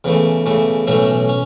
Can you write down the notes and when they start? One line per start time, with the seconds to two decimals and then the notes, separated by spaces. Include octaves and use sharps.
0.04 E2 C#3 E3 A3
0.46 E2 C#3 E3 A3
0.87 B1 A2 E3 A3 C#4
1.29 C#4